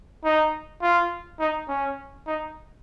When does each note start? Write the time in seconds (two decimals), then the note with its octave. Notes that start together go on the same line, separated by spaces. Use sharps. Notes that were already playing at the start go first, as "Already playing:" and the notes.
0.24 D#4
0.82 F4
1.40 D#4
1.69 C#4
2.27 D#4